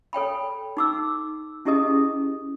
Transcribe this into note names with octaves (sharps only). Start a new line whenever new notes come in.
A4 C#5 G5 B5
D#4 D6 E6
C#4 E4 G4 G#4 D#5 D#6